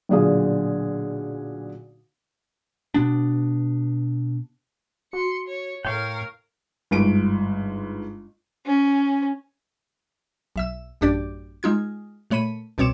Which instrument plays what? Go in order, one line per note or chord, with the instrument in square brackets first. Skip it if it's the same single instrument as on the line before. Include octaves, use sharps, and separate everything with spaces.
[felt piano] B1 A#2 D3 G#4 F5 D#6
[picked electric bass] B2 B3 D4
[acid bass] F#4 [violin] C6 C#7
[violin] C#5
[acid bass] A2 [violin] A#4 F5 [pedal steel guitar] C#5 G5
[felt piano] G1 G#2 D7
[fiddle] C#4
[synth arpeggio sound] B1 E5 E6
A1 F#2 D4 G4 D5
G#3 D#4 F4 G#6
A#2 A3 C#5 B5 D#7
C2 B2 C4 C#5 D6 E7